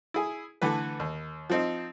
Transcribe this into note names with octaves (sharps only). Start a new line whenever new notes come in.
E4 G#4
D3 E3 A3 B4
D#2
F3 C4 D#4